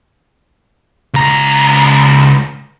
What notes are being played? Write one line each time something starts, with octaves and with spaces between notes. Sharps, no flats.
C#2 A#5